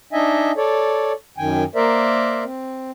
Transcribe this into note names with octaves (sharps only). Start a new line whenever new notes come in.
D4 D#4 D#5 E5 G#5
A4 C#5 D5
F#2 D#3 G5 G#5
A#3 A#4 C5 D5 E5
C4